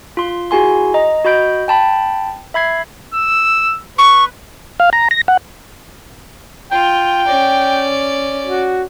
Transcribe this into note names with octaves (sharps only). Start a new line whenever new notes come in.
F4 C6
E4 F#4 G#4 G#5 C6
D#5 A#5
F#4 D#5 B5 G6 D7
G5 A5 B5
E5 B5 G#6 C7
E6
B4 C#6
F5
A#5
A#6
F#5
F4 G5
C#4 D5
F#4